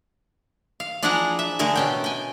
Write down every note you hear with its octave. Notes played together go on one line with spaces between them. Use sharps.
F5
F3 D4 E4 G#4 F#5 A#5
E5
D3 A3 G#4 A#4
B2 C#4 G5
G5 G#5